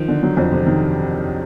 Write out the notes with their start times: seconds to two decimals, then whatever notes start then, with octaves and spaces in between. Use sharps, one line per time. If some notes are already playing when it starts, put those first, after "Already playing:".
Already playing: D#3 F3
0.08 D3
0.23 F#3
0.37 F2
0.52 C3
0.66 D#3